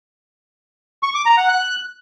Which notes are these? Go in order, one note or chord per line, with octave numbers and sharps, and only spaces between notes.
C#6
D6
A#5
F#5
F#6